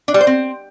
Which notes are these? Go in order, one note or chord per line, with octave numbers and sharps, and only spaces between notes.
D4
G3
C5
C4